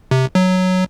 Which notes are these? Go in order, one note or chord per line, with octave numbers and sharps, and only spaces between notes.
C3
F#3